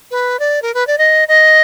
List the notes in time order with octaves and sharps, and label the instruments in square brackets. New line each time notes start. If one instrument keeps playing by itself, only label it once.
[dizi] B4
D5
A#4
B4
D5
D#5
D#5